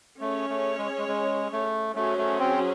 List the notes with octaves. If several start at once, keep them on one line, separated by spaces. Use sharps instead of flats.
A3 C#4 G#4 C#5
A3
G#3
G#3
G#3
A3
F#3 A3 C#4 G#4 C5
A3
C4